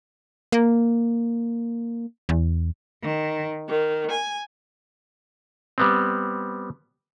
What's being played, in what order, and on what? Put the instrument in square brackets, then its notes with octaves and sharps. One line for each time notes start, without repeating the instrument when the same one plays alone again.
[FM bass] A#3
E2
[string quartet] D#3
D#3
G#5
[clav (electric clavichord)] G3 B3 C4